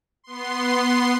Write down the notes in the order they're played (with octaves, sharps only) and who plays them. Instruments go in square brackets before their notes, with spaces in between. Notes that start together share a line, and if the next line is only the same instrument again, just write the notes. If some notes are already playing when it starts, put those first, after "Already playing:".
[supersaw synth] B3 C6